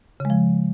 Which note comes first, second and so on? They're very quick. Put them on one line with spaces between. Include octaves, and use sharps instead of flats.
C#3 G#3 F3